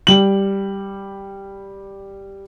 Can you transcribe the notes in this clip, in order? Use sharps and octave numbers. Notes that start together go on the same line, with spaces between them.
G3 F#7